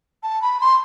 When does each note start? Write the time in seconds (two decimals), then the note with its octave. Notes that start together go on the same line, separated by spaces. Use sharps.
0.23 A5
0.42 B5
0.61 C6